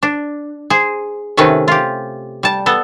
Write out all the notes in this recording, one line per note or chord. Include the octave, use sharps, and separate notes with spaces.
D4
G#4 C5
C3 D#3 A3 C#4 B4
F4 G4
G3 A5
B3 A4